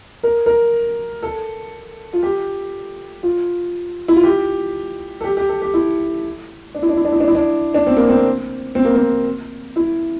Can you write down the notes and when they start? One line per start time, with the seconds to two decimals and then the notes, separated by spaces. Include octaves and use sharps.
0.23 A#4
0.46 A#4
1.23 A4
2.13 F4
2.23 G4
3.23 F4
4.08 E4
4.16 F4
4.23 G4
5.21 A4
5.24 G4
5.37 G4
5.49 A4
5.62 G4
5.74 E4
6.75 D4
6.82 E4
6.89 D4
6.97 E4
7.04 D4
7.12 E4
7.20 D4
7.28 E4
7.35 D4
7.74 D4
7.87 C4
7.97 A#3
8.09 C4
8.75 C4
8.85 A#3
8.96 C4
9.76 E4